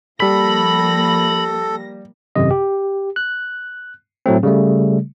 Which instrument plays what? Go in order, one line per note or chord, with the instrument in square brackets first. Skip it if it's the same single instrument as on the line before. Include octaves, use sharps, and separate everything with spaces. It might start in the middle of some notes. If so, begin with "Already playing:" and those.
[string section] F3 A#3 A#6 [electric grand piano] G3 B6 [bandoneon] A4 [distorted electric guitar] B5
[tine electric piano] G#1 F#2 C3 D#5
G4
F#6
A2 F#3 A3 C4
C#3 G3 A3